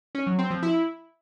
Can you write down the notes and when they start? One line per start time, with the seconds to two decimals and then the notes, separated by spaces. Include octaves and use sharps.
0.15 C#4
0.27 F#3
0.39 C4
0.51 F3
0.63 E4